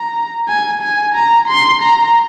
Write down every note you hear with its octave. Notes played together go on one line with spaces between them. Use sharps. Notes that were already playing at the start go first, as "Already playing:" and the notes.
Already playing: A#5
G#5
G#5
A#5
C6
A#5